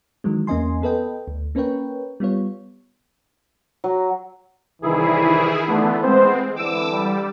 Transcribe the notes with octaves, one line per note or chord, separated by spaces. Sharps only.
D#3 E3 F#3 G#3
E2 A#3 C#4 D#5 G#5 C6
B3 A4 B4 D#5 G5
D2
A#3 C#4 A#4 B4 C#5 G5
G3 B3 F4 C#5
F#3
C2 D#3 E3 E4 G#4
D3 E3 A3 B3
G#3 B3 C4 C5
D3 E3 D6 E6
G3